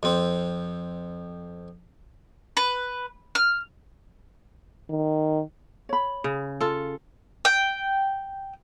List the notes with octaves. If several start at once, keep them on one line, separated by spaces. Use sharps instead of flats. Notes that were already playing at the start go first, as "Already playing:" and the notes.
F2 C4
B4
F6
D#3
C#5 B5
C#3
F4 A4
G5